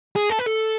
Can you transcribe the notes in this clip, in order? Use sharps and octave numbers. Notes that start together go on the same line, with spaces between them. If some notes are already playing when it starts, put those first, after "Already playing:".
G#4
A4
B4
A4